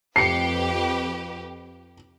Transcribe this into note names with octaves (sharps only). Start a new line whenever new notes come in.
F2 G4 B4 C7 C#7